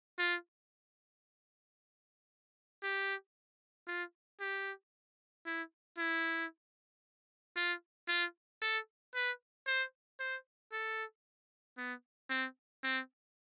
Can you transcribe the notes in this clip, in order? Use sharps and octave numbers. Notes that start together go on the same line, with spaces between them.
F4
G4
F4
G4
E4
E4
F4
F4
A4
B4
C5
C5
A4
B3
C4
C4